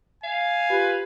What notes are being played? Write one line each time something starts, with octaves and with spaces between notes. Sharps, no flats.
F5 G#5
F4 G4 B4